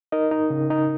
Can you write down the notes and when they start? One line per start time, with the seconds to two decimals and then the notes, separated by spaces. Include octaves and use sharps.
0.12 D#4 A#4 D#5
0.31 D#4
0.50 C#3
0.70 D#4